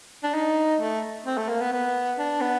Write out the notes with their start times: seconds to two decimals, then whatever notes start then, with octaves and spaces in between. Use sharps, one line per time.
0.24 D4
0.34 D#4
0.80 A3
1.26 C4
1.37 A3
1.49 A#3
1.61 B3
1.72 B3
2.19 D4
2.41 B3